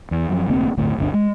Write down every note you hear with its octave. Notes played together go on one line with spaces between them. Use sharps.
E2
F#2 F3
F1 D2 A#3 C4
G1 D2 A2
G1 D2 C#4 D4
G#3